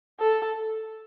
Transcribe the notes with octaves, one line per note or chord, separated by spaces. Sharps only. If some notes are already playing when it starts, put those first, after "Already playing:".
A4